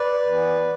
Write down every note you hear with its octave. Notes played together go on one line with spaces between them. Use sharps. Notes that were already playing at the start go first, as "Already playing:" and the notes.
Already playing: B4 D5
E3 B3